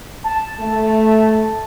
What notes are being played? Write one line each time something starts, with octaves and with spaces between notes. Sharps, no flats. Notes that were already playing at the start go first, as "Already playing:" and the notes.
A5
A3